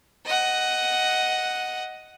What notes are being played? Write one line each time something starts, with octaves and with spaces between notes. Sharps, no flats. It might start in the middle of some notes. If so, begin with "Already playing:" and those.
D#5 F#5